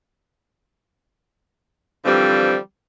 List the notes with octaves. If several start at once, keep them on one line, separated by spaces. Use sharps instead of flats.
D3 E3 F3 G3 C4